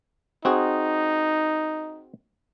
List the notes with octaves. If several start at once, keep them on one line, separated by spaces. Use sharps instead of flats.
C4 D#4 F#4 G#4